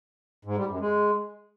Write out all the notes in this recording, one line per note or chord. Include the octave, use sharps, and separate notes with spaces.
G#2
G3
F#2
G#3